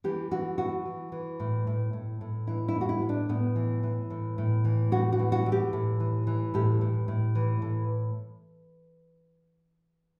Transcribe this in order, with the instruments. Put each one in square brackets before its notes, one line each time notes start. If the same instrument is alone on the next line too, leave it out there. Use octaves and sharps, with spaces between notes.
[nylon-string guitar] E3 G4
E3 F#4
E3 F#4
E3
E3
A2
A2
A2
A2
E3 E4
E4
A2
F#4
E4
A2
D4
A2 B3
E3
E3
A2
A2
E3
A2 F#4
F#4
E3
F#4
E3
G4
A2
E3
E3
A2 G4
A2
A2
E3
A2